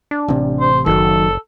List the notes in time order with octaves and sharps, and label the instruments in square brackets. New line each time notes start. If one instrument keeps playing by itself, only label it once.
[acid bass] D4
[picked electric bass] A1 C3
[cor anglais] C5
[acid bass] F#1 [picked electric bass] D#3 F3 F#3 [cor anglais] A4